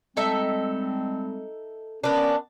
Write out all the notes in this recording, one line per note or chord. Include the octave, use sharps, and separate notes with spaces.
G3 G#3 C4 D#4 A4 E5
B3 C#4 D4 A#4